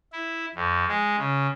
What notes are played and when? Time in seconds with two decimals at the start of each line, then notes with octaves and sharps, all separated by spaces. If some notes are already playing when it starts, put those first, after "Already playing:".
0.12 E4
0.56 F2
0.88 G#3
1.19 C#3